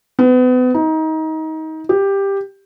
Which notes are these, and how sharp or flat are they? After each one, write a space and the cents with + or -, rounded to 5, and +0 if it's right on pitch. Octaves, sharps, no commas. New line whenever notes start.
B3 +35
D#4 +25
G4 +10